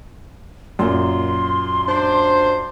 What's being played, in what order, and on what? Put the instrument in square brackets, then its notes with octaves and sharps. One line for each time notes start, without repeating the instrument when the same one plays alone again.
[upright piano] F#2 A#2 [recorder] C6
[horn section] D4 C5